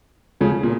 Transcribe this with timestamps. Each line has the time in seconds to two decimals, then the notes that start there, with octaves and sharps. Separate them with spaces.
0.41 C#3 F3
0.63 A#2